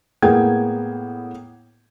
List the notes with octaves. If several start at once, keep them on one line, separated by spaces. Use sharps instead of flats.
A2 A#3 B3 G#4 G5 G#6